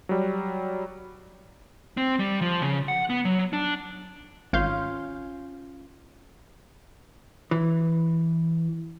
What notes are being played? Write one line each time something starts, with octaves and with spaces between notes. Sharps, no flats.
F#3 G3
C4
G3
F3
C#3
F#5
B3
F#3
D4
G#1 C#4 F4 F5 G6
E3